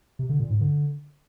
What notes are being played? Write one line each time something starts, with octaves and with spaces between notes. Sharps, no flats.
C3
D3
A#2
G#2
D3